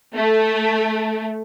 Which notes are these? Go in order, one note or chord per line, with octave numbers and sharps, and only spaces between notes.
A3